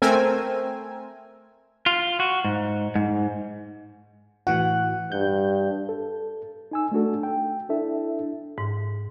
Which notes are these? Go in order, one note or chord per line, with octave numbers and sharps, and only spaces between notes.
A3 C4 A#4 G#5 E6
F4
F#4
G#2
G#2
A2 E3 F#4 F#5
G2 G6
A4
D#4 G#5 E6
A3 D4 F#4 A4
G5
D4 E4 A4 E5
G#2